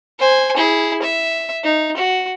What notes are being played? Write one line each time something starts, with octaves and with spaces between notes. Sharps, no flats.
C5 G#5
E4 G#4
E5
D#4
F#4